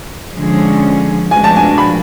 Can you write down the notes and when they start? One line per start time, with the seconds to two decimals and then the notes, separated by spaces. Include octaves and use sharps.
0.36 D3 F3 G#3 C#4 G#4
1.30 F3 G#3 D4 F#4 G#5
1.44 A5
1.56 G#5
1.78 B5